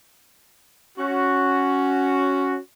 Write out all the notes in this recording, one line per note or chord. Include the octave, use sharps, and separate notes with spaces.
C#4 F#4